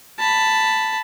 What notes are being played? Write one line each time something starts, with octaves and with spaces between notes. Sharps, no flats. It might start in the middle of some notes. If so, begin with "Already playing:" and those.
A5 B5